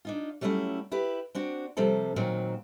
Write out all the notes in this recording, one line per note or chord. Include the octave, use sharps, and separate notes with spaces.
D4 D#4 F4
F#3 G3 A3 C4 C#4 E4
E4 G4 B4
C4 D4 F#4
C3 F3 G3 C4 A4
A#2 D#3 F#3 C4